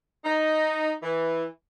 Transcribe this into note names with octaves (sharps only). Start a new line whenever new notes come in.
D#4
E3